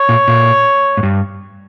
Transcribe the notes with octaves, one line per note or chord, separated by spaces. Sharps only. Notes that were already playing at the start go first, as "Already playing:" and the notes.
Already playing: C#5
A#2
A#2
G#2
G2